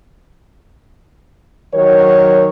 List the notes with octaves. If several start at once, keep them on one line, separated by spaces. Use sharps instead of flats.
D#3 F#3 A#4 C#5